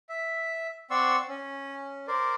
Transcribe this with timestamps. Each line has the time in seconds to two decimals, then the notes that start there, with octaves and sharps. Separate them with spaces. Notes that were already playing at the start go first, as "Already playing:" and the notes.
0.09 E5
0.91 C4 D5 F#5 C6 C#6 E6
1.29 C#4
2.08 A#4 C5 D5